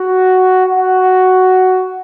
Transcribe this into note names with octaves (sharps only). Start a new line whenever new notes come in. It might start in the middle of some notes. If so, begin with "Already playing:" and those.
Already playing: F#4
F#4